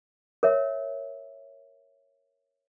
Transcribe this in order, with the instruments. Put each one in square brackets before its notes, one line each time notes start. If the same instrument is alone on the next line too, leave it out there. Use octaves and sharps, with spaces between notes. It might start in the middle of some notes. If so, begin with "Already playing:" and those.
[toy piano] A#4 C#5 E5